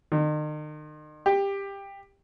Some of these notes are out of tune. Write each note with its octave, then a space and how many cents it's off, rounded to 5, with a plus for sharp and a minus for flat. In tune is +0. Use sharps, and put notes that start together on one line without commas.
D#3 -40
G4 +15